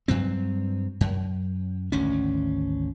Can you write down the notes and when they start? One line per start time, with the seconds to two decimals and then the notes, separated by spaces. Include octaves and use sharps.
0.08 G2 F#3 C4
1.01 F#2
1.92 G#1 D2 C#4